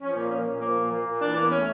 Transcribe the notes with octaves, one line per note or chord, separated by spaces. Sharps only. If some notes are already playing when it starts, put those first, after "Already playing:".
F3 C#4
A#2 A#3
A#3 C#4
A#2 C#4
F3 A#3
A#2
A#3
A#2
E3 D4
E2 A#3
A3 C#4